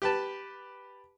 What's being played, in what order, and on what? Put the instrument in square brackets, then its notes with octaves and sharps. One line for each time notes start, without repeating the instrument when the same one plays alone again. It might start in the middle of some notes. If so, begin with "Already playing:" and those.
[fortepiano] G4 B4 A5